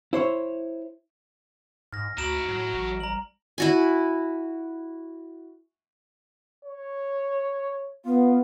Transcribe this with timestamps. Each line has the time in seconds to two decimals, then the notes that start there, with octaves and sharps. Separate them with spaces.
0.13 E4 C5 C#5
1.93 G#2 F6 A#6
2.18 D2 D#4 F#4 A#5 B5 D7 E7
2.49 A2 F#3
2.74 A1
3.00 G3 A#5 F#7
3.58 E4 F#4 G#5
6.65 C#5
8.06 B3 F4